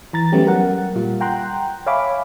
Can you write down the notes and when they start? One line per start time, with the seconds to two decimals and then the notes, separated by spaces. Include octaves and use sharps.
0.13 E3 A#5 A6
0.32 F#3 G3 A3 B3 C#4 G4
0.45 F#3 A#4 F#5
0.95 A#2 G3 F4
1.20 F#5 G5 A#5 C6 F#6
1.86 C#5 E5 F5 G#5 B5 D6